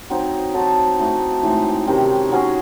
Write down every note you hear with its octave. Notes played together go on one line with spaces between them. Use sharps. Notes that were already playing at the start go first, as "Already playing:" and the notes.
F#3 C4 D#4
F#3 C4 D#4 A4
E3 A3 D#4 F#4
A2 E3 G#3 D#4
C3 D#3 G#3 C#4
F#3 C#4 G#4